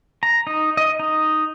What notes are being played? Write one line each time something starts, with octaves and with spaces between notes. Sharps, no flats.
A#5
D#4
D#5
D#4